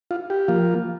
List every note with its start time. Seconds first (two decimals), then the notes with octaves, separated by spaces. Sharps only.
0.11 F4
0.30 G4
0.48 F3 A#3 F4